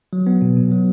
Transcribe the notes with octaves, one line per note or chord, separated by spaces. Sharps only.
F#3
B3
B2
B2
F#3